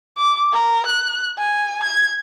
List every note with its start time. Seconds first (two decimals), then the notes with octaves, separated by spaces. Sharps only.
0.17 D6
0.53 A#4
0.86 F#6
1.38 G#5
1.83 G#6